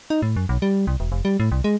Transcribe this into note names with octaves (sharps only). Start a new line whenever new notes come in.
D#4
A2
F#2
B1
G3
C2
E1
F1
G3
A2
C2
G#3